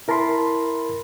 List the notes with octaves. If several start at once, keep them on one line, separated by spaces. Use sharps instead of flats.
E4 A#4 A5 B5 C6